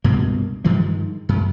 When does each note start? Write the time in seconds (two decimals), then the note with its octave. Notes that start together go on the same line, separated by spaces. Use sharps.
0.04 C#2 G2 B2 A#3
0.64 G2 D#3 F3 G#3
1.29 F#2